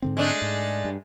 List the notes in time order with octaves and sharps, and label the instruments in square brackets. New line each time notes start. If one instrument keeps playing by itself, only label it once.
[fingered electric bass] G#2 D3 C4
[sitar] G#3 A3 D4
[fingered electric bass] G#2
G2